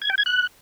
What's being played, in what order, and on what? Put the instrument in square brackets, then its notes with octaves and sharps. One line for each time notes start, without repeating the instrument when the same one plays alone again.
[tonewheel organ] G#6
G5
G#6
F#6